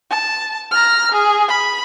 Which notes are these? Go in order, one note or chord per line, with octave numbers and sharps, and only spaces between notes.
A5
A#5 F6
G#4
B5